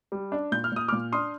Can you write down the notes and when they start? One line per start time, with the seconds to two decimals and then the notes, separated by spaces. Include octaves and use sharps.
0.12 G3
0.32 D4
0.52 A#2 G6
0.64 F6
0.72 A#2 D#6
0.88 D6 F6
0.92 A#2
1.12 D4 C6 D#6